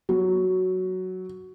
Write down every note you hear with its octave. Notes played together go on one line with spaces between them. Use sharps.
F#3